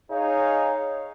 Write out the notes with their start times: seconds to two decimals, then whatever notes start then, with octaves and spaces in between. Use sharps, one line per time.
0.11 D#4 G#4 C#5 F5